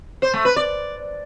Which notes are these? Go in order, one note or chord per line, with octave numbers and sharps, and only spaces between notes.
C5
A3
B4
D5